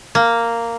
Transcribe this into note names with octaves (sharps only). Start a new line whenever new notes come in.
A#3